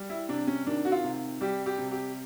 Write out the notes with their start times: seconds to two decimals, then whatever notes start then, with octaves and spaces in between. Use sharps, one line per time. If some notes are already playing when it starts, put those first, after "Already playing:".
Already playing: G3
0.10 E4
0.29 C3 D4
0.47 C#4
0.67 D#3 D4
0.85 F#4
0.92 F4
1.04 C3
1.41 G3 G4
1.66 G4
1.78 C3
1.92 G4